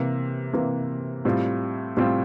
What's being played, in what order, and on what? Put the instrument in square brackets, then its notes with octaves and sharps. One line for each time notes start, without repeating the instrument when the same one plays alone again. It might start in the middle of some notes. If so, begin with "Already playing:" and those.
Already playing: [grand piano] C3 E3 A#3
C3 E3 A#3
A2 G3 C4 F4
A2 G3 C4 F4